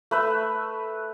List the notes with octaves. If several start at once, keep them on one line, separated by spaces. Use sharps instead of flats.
A3 B4 E5